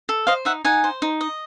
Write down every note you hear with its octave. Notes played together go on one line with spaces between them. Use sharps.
A4
C5 D#5 F5
D#4 E5 F#5
D#4 F#5 G#5
C5
D#4
D#5